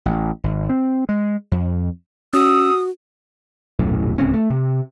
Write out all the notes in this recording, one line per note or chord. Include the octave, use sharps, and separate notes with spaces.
A1
G#1
C4
G#3
F2
C#4 F#4 D#6 E6
D#1 B1 F#2 A2
D1 C#2 C4 C#4
A3
C3